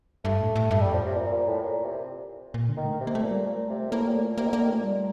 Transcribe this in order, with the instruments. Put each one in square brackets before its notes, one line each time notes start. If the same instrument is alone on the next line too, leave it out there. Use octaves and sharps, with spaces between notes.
[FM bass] G2 [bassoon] A3
[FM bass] A2
A2
[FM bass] G2 [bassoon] A3
[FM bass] F2 [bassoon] G3
[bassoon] F3
C3
A#2
A#2
A2
A#2
C3
[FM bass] A#2
D3
[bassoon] D#3
[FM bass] A3
[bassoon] C3
[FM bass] A#3
A3
[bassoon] A#2
[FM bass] G3
[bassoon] A#2 [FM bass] A3
[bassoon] C3
[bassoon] A2 [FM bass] A#3
[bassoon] A#2
[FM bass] A3
[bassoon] A#2
[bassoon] C3 [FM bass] A#3
[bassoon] D#3
[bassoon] D3 [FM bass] A#3
[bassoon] D#3
[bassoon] A#2 [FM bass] A3
[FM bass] G3